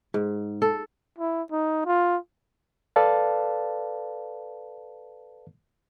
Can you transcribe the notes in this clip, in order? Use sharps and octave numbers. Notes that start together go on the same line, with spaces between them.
G#2
A4
E4
D#4
F4
A4 B4 D5 F5 A5